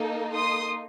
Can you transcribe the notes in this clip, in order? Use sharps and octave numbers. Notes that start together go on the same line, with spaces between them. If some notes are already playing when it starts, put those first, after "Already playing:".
Already playing: A#3 D#4 A4
C6 D#6